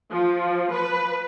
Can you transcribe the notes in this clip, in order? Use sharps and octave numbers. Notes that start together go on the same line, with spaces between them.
F3
B4